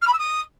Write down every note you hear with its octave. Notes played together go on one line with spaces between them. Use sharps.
F6
B5
E6
D#6